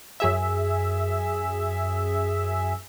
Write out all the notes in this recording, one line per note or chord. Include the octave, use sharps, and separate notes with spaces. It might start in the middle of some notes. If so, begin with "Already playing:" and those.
F#2 G#4 E5